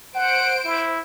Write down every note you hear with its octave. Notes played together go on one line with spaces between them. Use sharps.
C5 F#5 D7
E4